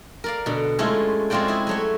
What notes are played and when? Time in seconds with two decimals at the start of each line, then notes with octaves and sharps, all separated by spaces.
0.24 A#4 D5 F5
0.46 B2 D3
0.79 G#3 A3 C#4 E4 F4
1.30 G#3 C4 F4 F#4 D5 G5
1.48 E4 G#4
1.67 F#3 A3 C#5